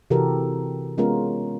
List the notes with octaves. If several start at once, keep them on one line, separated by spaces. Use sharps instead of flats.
C3 E3 F#4 G4 A4 A#4
G#3 B3 C#4 F4 A#4